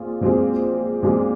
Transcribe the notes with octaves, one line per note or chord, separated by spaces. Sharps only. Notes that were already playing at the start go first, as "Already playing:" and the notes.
Already playing: A#2 C4 F4 G#4
A#2 G#3 C4 F4 G#4
A#2 G#3 C4 F4 G#4